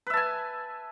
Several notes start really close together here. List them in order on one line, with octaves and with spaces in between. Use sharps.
B4 E5 A5 G#5